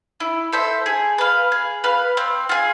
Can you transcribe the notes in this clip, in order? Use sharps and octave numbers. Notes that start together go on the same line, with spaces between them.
E4
A4 C5 E5
G#4
B4 F5
G#4
B4 F5
C4
F4 G#4